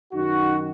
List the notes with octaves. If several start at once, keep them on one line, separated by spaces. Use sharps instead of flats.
F#2 D#3 D#4 F#4